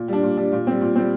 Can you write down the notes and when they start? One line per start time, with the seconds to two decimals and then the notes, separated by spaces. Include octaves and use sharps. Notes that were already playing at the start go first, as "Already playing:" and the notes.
Already playing: A#2
0.08 G3 D4
0.23 A#2
0.37 G3 D4
0.52 A#2
0.67 G3 C4
0.81 A#2
0.96 G3 C4